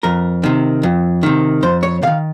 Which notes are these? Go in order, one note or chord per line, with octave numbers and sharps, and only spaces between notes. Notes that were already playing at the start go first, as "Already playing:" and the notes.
F2 A#4
C3 D#3
F2
C3 D#3
F2 C5
C#5
C3 D#3 F5